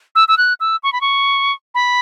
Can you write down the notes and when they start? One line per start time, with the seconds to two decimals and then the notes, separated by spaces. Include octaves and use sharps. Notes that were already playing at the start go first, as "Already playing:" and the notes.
0.15 E6
0.28 E6
0.38 F#6
0.60 E6
0.83 C#6
0.93 B5
1.01 C#6
1.75 B5